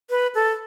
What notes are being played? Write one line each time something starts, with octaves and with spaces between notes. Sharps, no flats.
B4
A4